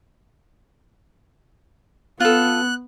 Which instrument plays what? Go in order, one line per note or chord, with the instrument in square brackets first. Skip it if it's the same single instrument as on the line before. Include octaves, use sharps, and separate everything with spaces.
[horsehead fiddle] B3 [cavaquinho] F4 A4 [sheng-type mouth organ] F#6